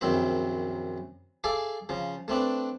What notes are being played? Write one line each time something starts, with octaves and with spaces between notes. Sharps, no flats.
A#1 F#2 D#3 C4 E4 E5
G#4 A4 D5 E5 F5
C#3 F3
A3 C4 D4 B4